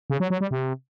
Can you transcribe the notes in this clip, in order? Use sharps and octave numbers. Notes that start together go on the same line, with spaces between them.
C#3
F#3
F#3
G3
C3